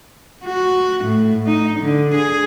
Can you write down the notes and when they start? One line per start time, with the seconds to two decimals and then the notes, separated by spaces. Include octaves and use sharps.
0.45 F#4
1.05 A2
1.46 D#4
1.80 D3
2.15 G#4